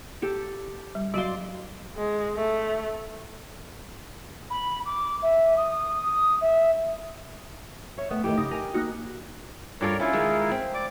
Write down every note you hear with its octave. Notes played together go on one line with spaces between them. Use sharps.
G4 A4
G3
F#3 F#4 D5 F5 C6
G#3
A3
B5
D6
E5
D#6
E5
C#5 E5
A3 B3 E5 G5
D#3 A3 E4 G4
C#3 D#4
A#4 D#5 G#5
A#3 D#4 F#4
G2 F4 A4 A#4 C#5 D5
C#4 E4 F4
D#3 G#3
C4
D5 D6